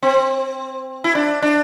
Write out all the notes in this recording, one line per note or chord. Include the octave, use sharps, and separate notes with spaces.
C4
E4
D4
D4